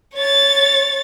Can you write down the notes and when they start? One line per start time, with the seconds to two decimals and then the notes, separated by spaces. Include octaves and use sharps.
0.15 C#5 A6